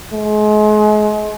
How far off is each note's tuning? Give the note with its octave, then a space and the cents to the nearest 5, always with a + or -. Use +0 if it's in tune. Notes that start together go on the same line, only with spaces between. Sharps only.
G#3 +35